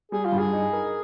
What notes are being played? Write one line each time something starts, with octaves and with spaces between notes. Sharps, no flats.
G3 G#4
F4
G2
G#4
D#4
A#4